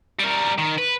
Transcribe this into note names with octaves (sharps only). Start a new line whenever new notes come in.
G3 A#4
D#3
B4